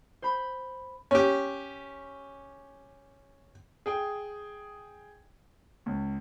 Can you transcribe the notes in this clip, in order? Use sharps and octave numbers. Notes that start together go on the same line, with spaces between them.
C5 B5
C#4 G4
G#4 G5
C#2